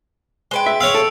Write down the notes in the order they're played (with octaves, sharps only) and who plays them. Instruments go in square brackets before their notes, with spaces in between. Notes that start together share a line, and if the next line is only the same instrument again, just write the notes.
[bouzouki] G#3 B4 G5 [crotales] D7 G7
[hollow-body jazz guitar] E5
[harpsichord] C#5 F5 [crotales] E6
[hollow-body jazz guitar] A4 [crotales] C#7 D7